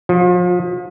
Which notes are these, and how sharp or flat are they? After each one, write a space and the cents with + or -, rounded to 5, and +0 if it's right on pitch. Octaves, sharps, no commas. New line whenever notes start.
F3 +35